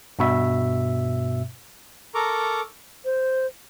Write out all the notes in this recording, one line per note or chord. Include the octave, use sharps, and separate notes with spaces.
G2 B2 E5
A4 A#4 A#5 C#6 D6
C5